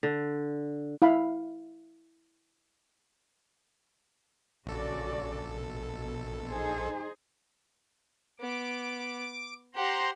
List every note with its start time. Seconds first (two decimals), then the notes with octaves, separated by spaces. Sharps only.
0.03 D3
1.02 E4 F5 B5
4.66 A#1 C#3 F#4 A4 D5
5.50 B2
6.50 D#4 G#4 C5
8.40 B3 D6
9.75 G4 C5 F#5 A#5 C6